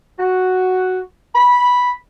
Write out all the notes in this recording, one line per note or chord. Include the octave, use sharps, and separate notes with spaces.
F#4
B5